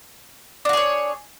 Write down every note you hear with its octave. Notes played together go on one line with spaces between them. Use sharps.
D4 F#4 G#4 C#5